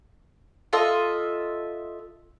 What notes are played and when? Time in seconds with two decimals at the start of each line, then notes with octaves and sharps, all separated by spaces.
0.73 F4 A4 D#5 E5